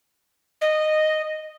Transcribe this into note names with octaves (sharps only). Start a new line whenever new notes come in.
D#5